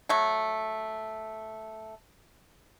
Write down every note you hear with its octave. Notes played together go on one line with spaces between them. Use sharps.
F#3 A3